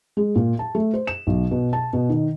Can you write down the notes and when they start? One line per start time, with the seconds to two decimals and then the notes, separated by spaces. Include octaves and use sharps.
0.17 G#3
0.36 A#2
0.59 A5
0.75 A3
0.94 C5
1.07 E7
1.27 B1
1.51 B2
1.73 A5
1.93 B2
2.10 D#3